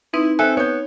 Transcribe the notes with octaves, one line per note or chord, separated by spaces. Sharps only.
C4 D#4 E4 B4
C4 A4 E5 G#5 F#6
B3 C#5 G6